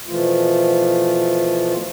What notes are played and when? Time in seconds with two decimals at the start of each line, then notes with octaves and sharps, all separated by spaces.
0.07 B2 E3 F3 A3 F4